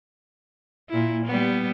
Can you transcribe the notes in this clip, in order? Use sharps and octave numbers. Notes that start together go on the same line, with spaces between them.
A#2 E4
G3 B3